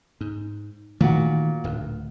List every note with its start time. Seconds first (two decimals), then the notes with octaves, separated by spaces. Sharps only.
0.21 G#2
1.01 A#2 D#3 E3 A3 F#4
1.64 D1 D2